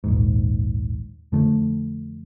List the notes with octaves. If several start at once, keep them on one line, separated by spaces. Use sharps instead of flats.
A#1 D#2 G#2
F2 D3 F3 A3